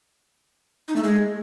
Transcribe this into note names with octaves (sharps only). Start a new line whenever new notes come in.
D#4
A3
G#3